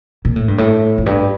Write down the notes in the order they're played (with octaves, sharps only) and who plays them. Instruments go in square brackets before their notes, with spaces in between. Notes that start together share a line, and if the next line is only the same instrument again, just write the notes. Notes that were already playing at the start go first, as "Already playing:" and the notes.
[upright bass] A#2
A2
G2
A2
F2
G2